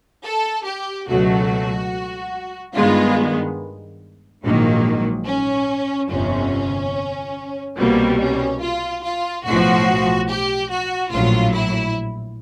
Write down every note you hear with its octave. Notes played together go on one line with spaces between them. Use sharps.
A4
G4
C#2 B2 F#3 A3 F#4
G2 D#3 G#3 B3 F4
A#1 G#2 D#3 F#3 A#3
C#4
G1 F2 C3 C#4
C2 B2 G3 A#3 C4
C#4
F4
F4
B1 A2 F3 F#4
G4
F#4
A#1 A2 F#3 F4
E4